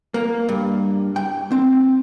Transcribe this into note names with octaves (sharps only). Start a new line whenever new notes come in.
A#3
G2
G5
C4